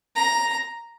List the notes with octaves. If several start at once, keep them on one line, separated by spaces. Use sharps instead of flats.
A#5